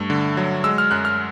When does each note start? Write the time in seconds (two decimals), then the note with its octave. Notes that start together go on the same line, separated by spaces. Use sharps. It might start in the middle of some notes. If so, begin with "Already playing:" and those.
Already playing: G2 A3
0.10 D3
0.37 F#3
0.64 G#3 E6
0.78 F6
0.91 F#2 F#6
1.05 F6